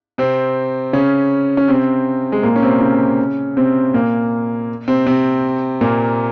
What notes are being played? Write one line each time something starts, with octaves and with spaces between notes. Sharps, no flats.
C3 C4
C#3 C#4
C#4
C3 C4
G#3
A#2 A#3
C#4
C3 C4
C#3 C#4
C3 C4
A#2 A#3
C3 C4
C3 C4
A#2 A#3